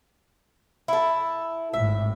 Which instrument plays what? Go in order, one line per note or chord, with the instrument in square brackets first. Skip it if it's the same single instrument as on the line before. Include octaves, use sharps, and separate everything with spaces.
[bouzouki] E4 A4
[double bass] G#1 A2 [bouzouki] E5